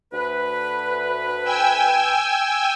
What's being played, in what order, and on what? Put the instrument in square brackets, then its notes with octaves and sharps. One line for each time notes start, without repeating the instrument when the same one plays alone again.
[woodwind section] D2 B4
[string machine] G5 G#5 E6